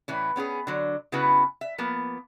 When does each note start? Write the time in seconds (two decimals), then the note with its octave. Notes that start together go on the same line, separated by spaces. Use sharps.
0.08 A2 E3 C#4
0.36 B3 C#4 G4 G#4
0.67 D3 F#3
1.12 C#3 B3 C#4 E4 F#4 B4
1.61 E5
1.78 F3 A#3 B3